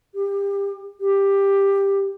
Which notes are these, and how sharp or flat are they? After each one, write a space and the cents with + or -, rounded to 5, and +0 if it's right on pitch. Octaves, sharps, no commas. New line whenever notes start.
G4 +25
G4 +10